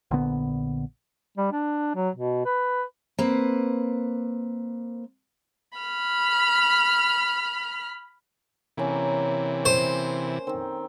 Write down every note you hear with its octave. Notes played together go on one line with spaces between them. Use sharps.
A#1 D3 B3
G3
D4
F#3
B2
B4
A#3 C4 B4
B5 F6
C3 E3 A#3 C#4
C5
D#3 C4